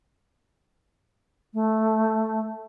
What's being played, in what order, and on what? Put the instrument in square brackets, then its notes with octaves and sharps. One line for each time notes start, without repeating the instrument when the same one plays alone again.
[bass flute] A3